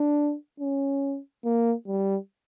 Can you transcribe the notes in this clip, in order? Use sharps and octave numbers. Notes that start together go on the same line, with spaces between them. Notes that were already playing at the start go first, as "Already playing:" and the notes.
Already playing: D4
C#4
A#3
G3